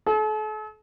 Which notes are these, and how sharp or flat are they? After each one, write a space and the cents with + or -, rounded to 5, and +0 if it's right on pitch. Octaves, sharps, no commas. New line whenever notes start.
A4 -40